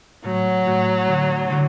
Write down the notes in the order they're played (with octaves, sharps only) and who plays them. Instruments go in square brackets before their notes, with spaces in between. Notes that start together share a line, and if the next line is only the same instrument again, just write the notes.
[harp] A2 A3 F#4 [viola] F#3
[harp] A2 A3 F#4
D3 A3 D4 F#4
D3 A3 D4 F#4